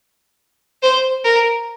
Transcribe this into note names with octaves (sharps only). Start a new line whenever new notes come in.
C5
A#4